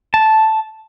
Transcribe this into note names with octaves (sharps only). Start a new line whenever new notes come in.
A5